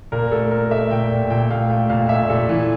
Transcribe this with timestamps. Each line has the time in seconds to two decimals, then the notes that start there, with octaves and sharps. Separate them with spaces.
0.12 A#2 A#4
0.32 A3 A4
0.51 A3 A#4
0.71 A3 E5
0.91 A#2 G5
1.11 A#2
1.30 A#2 G5
1.50 A3 F5
1.70 A3 G5
1.90 A#2 F5
2.09 A#2 E5
2.30 A#2 A4
2.49 E3